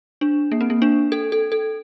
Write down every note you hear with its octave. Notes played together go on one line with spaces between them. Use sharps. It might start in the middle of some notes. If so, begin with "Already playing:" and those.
D4
A#3
C4
A#3
D4
A4
A4
A4